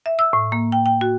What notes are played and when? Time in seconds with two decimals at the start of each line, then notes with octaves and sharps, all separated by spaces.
0.06 E5
0.19 E6
0.33 A2
0.52 A#3
0.72 G5
0.86 G5
1.01 F#4